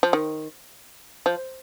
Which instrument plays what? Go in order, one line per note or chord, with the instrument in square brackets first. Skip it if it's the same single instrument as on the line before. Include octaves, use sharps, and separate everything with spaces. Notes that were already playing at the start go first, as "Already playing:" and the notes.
[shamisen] F3
D#3
F3